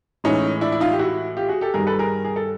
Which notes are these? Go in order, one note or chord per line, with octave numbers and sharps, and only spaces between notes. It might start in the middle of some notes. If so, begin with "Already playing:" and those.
A2 E3 G#3 C#4 D#4
D4 E4
E4
D#4 F4
G4
E4 F#4
F4 G4
F#4 G#4
G4 A4
G2 D#3 G3 G#4 A#4
A4 B4
G#4 A#4
G#4
A4